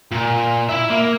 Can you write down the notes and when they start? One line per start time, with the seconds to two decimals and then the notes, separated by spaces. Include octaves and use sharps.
0.11 A#2
0.69 E4 E5
0.90 A#3